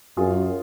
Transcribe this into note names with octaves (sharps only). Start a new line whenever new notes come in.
F#2 F4 G#4